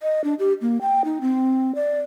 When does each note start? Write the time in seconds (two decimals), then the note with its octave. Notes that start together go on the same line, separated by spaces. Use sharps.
0.02 D#5
0.24 D4
0.39 G4
0.61 A#3
0.81 G5
1.05 D#4
1.21 C4
1.75 D5